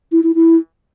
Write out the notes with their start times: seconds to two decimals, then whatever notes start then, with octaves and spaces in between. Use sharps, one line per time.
0.12 E4
0.24 E4
0.35 E4